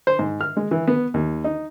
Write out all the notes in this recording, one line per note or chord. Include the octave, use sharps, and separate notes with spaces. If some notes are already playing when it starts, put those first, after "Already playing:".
C5
G#2
F6
G#3
E3
B3
D#2
D#4